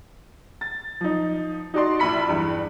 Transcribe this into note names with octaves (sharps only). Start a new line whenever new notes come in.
A6
F3 D#4
D#4 F#4 D5 C6
A#1 E4 B5 B6 C#7
E2 G2 E3